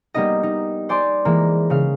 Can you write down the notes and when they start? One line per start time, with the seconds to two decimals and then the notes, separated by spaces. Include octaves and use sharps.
0.14 G3 A#3 B3 D#4 D#5
0.43 D#4
0.89 C5 D5 G#5 C6 D6
1.25 E3 G#3 A#3
1.70 C#3 F5